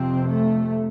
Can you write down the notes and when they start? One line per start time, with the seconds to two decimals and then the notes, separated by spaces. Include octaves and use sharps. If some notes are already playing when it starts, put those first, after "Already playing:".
Already playing: F2 C3 C4
0.27 A3